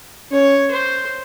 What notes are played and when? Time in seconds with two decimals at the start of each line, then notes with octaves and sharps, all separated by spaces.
0.31 C#4 C#5
0.71 C5